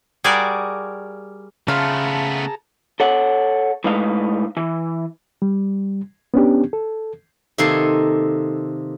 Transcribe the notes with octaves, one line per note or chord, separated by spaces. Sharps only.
G3 F#4 G#4 A#4 D5
C#3 A3 B3 F4 G#4 A5 A#5
A4 C#5 F#5
A2 G#3 D#4 B4 F5
E3
G3
B3 C#4 D4 G4
A4
C3 D#3 A#3 A4 G#5 C6